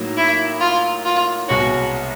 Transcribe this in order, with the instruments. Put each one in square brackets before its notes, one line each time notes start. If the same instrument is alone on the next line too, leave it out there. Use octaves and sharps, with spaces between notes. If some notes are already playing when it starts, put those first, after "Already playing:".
Already playing: [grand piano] A2 F#3 A#3 D#4
[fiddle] E4
F4
F4
[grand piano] C2 B2 G#3 C#4 [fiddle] F#4